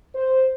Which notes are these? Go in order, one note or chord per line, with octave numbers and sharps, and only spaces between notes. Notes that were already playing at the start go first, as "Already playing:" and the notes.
C5